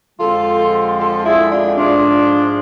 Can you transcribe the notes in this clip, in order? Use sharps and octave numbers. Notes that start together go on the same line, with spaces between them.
F2 D3 F3 G#3 F4 A4
F4 A4
E4 G#4
D4 F4
G#2 F3 G#3 D4 F4